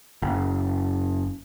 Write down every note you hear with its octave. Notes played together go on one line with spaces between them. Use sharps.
F#1